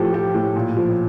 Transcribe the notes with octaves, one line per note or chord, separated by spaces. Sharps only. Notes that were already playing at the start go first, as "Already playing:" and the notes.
Already playing: A2 F3 G4 A4
F3 G4
A2
A#2
F3